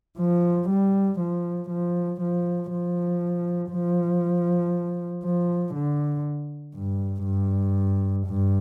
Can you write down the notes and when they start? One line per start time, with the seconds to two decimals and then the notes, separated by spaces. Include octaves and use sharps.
0.19 F3
0.69 G3
1.19 F3
1.70 F3
2.21 F3
2.71 F3
3.72 F3
5.24 F3
5.75 D3
6.75 G2
7.25 G2
8.27 G2